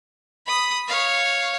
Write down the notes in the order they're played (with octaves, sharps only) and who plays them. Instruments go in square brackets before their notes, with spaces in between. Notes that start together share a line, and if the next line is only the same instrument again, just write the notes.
[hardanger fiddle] B5 D#6
C#5 F5